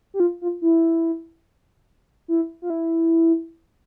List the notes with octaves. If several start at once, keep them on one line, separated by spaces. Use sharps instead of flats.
G4
F4
F4
E4
E4
F4
E4